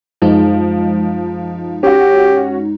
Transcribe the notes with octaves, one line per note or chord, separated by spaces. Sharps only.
F#2 F3 G#3 D#4
C#4 F#4 G4